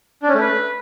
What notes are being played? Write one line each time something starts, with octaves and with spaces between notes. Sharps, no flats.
D4
C#4
A3
B4